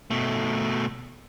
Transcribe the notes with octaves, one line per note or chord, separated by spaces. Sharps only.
B2 A3